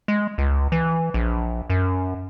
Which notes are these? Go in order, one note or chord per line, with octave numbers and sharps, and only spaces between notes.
G#3
C#2
E3
A#1
F#2